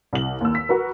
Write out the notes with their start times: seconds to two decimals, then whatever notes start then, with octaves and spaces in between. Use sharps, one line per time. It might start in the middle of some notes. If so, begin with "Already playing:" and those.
0.13 C2 F#7
0.41 D#2 E6
0.55 B6
0.69 F#4 A#4 B4